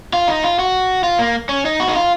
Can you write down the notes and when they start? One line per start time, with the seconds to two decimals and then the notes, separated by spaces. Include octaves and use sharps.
0.13 F4
0.28 D#4
0.44 F4
0.59 F#4
1.03 F4
1.19 A#3
1.49 C#4
1.65 D#4
1.80 F#4
1.88 D#4
1.95 F4